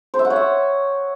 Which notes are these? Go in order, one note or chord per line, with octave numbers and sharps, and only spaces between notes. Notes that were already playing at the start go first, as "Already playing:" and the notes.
C5
E5
F#5
C#5
E5